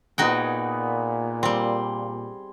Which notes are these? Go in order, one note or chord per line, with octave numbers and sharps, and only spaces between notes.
A#2 B3 D#4 F#4 G#4 G5
G3 C4 C6